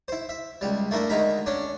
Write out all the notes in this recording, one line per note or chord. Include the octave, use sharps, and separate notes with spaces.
E4 C5
E5
C#2 G3
A3 A#3 D4 E4
D2 D#3 G#3 A#5 B5
C#4 D4 C#5